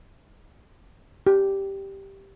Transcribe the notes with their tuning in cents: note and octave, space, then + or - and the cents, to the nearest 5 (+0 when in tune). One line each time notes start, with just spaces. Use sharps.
G4 +0